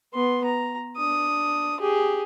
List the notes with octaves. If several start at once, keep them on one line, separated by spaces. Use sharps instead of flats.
B3 C6
A#5
D4 D#6
G4 G#4